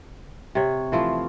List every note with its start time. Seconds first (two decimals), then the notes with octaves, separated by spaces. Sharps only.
0.55 C3 C#5
0.92 E3 F3 A3 F4